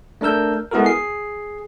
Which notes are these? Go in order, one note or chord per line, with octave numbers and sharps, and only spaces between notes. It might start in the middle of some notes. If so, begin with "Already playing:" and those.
A3 D4 A#4 E6 G6
G#3 B3 E4 F#4 A4 A#4
G#4 C7